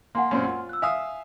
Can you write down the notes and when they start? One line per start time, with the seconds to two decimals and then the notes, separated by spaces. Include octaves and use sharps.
0.15 A#3 F#5 G#5 C6
0.31 F#2 A#2 C4
0.44 F4
0.69 E6 F#6
0.82 E5 F5 G#5 D#6